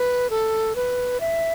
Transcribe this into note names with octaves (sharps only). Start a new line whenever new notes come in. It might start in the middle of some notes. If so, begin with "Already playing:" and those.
Already playing: B4
A4
B4
E5